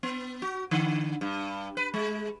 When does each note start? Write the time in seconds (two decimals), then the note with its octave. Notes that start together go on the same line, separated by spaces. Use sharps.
0.03 B3
0.42 F#4
0.71 D3
1.21 G2
1.77 B4
1.94 G#3